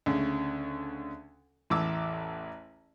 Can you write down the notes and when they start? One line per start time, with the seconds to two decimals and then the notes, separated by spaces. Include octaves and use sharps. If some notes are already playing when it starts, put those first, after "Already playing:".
0.06 D2 C#3
1.70 A1 E2 A5 D6 E6